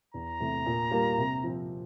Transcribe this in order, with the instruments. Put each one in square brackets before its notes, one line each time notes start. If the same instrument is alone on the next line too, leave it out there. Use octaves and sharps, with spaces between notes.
[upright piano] E2 [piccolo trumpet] A#5
[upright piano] C3 E3 A3
A#2
G3 A#3 F4
C3
F3 C4